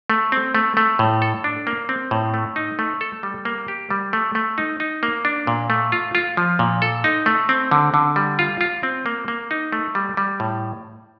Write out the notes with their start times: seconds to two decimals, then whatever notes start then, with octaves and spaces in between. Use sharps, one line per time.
0.10 A3
0.32 C4
0.55 A3
0.77 A3
0.99 A2
1.22 A4
1.44 D4
1.67 A#3
1.89 C4
2.11 A2
2.34 A3
2.56 D#4
2.79 A3
3.01 A4
3.23 G3
3.45 A#3
3.68 G4
3.90 G3
4.13 A3
4.35 A3
4.58 D#4
4.80 D#4
5.03 A#3
5.25 D4
5.47 A#2
5.70 A3
5.92 F4
6.15 F4
6.37 F3
6.59 A#2
6.82 A4
7.04 D#4
7.26 A3
7.49 C4
7.71 D3
7.94 D3
8.16 G3
8.39 F4
8.61 F4
8.83 C4
9.06 A#3
9.28 A#3
9.51 D#4
9.72 A3
9.95 G3
10.17 G3
10.40 A2